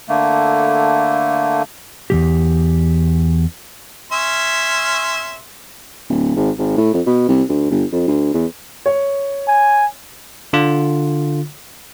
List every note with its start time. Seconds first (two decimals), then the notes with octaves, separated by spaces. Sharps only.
0.09 D3 A3 A#3
2.10 E2 E3 G4
4.12 C#4 E5 C6
6.09 D1
6.36 G#1
6.58 G#1
6.77 A2
6.94 F2
7.06 B2
7.28 C2
7.49 D2
7.70 G1
7.92 F2
8.08 D2
8.34 E2
8.86 C#5
9.48 G#5
10.53 D3 F4